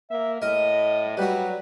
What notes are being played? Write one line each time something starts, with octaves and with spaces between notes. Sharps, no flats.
A#3 E5
A2 A#4 D#5
F#3 G3 F#4 B4